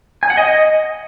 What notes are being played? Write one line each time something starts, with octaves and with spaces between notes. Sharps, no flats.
G#5
F#5
D#5